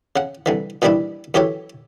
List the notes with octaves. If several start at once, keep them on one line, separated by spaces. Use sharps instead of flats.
C#3 F#5
C2 D3 E3
A#2 D#3 E3 G3 D4 E4
F#2 E3 G4 A4 C#5